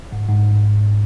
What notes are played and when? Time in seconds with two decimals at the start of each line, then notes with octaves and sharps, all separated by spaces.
0.12 G#2
0.29 G#2